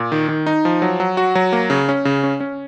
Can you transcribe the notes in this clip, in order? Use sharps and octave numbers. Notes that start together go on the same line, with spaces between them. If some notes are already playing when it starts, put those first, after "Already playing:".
Already playing: A#2
D#3
D#3
D#4
F3
F#3
F#3
F#4
F#3
A#3
C#3
C#4
C#3
C#4
C#4